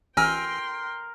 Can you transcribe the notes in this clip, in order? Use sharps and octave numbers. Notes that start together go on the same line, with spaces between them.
A1 A#4 G5 G#5 C6 E6